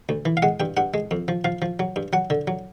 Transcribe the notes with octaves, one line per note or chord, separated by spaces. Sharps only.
D2
E3
F5
G#3 F#5
G2 G5
G2 F#5
G#3
F2
F3
F3 F5
F3
F#3
G2
F#3 F#5
D3
F#3